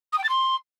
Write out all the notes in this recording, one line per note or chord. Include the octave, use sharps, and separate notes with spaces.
D#6
G5
A6
C6